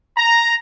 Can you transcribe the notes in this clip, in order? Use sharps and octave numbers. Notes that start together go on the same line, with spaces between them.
A#5